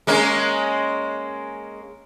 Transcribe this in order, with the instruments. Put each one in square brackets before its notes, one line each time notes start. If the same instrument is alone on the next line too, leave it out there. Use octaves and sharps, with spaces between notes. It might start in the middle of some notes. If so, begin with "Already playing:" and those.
[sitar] G#3 A#3 C#4